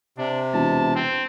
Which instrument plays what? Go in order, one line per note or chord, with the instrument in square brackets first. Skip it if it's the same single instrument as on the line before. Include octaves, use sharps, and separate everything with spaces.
[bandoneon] C3 [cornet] D4
[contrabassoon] E1 [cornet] A5
[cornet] C4